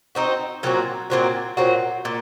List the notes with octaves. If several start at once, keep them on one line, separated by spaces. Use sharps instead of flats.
C4 D#4 F#4 C5
A#2 F#3 C4 F#4
A#2 F#3 C4 F#4
A#2 F#3 C4 F#4
A#2